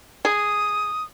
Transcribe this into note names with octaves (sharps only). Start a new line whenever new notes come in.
G#4 D#6